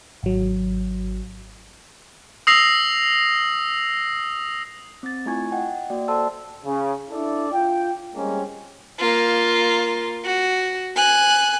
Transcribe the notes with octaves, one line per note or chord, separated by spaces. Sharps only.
G#1 F#3
D#6 E6 A#6 C7 F7
C4 A6
A3 E4 F4 G#5 C#6 G#6
D#5 F#5 G5
A#3 F#4 D5 G5
A4 C5 D5 A5 C6 E6
C#3
D4 E4 A4 D5
F4 G5
G3 G#3 A#3 C4 C#4
A#3 F4
F#4
G#5 F#6